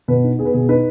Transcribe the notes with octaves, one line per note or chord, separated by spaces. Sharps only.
B2 B4
D#4
B3 G#4
B4
B2 G#4
D#4 B4